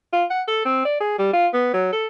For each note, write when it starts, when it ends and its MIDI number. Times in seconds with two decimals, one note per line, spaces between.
0.13 0.25 65
0.31 0.42 78
0.48 0.64 69
0.66 0.83 60
0.85 0.97 74
1.01 1.19 68
1.19 1.29 55
1.33 1.48 65
1.54 1.73 59
1.74 1.90 54
1.93 2.07 69